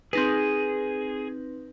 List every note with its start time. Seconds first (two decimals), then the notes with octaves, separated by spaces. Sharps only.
0.13 C4 D#4 G#4 B4